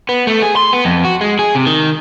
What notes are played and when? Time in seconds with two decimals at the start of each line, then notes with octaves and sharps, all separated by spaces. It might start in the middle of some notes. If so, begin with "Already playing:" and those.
0.09 B3
0.27 A3
0.42 G#4
0.56 C6
0.73 B3
0.85 F2
1.05 F#4
1.21 G#3
1.39 G#4
1.55 C3
1.67 D#3